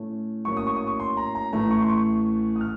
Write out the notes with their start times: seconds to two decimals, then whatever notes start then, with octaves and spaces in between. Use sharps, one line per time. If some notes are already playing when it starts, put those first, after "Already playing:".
Already playing: A2 A3 C#4
0.45 A2 F#3 A#3 C#4 C#6
0.57 D#6
0.67 C#6
0.76 D#6
0.87 C#6
1.00 C6
1.17 A#5
1.35 A#5
1.53 A1 A2 A3 A#5
1.71 C#6
1.82 C6
1.90 C#6
2.56 D#6
2.61 F6